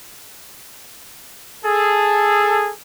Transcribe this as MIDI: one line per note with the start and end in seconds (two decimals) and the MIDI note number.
1.65 2.71 68
1.65 2.71 69